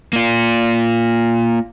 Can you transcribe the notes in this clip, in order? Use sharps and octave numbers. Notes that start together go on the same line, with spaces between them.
A#3 F4